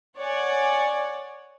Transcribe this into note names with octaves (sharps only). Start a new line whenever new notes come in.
C#5 D5 F#5 G#5